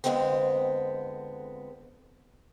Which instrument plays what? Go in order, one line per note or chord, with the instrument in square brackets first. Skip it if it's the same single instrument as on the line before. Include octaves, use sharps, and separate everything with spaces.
[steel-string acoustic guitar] F2 A2 D3 G#3 B3 C4